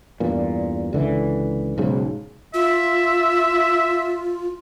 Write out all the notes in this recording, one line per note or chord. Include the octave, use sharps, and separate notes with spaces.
E2 G2 A#2
C#2 D3 E3
B1 G#2 C#3
F4 E5